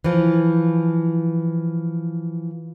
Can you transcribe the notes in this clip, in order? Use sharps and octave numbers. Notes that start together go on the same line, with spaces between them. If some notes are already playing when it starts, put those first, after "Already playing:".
E3 F3